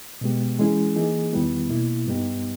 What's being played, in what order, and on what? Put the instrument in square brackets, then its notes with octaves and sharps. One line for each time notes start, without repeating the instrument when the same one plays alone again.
[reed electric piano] B2 G#3 B3 G4
E3 G#3 C#4 E4 G#4
E3 A#3 D#4 G#4
E2 D#3 G3 B3 E4
B2 A#3 E4
G2 G3 B3 D#4 G4